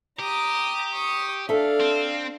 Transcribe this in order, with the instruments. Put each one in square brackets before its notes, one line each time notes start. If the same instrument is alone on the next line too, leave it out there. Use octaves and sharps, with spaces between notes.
[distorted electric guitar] G4 [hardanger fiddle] A#5 D#6
[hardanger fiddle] C#6 D#6
[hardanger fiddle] D4 F5 [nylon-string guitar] A4 E5
[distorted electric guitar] C4